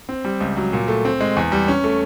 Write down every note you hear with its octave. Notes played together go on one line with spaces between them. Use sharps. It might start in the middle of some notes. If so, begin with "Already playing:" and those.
C4
G3
C#2
F#3
A#2
A3
C4
G#3
E2
G3
C#4
A3